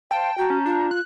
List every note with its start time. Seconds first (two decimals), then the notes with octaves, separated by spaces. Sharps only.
0.11 C5 F5 G5 A5
0.38 F#4 A5 A#5 G6
0.50 C#4
0.66 D4 F4
0.91 F#6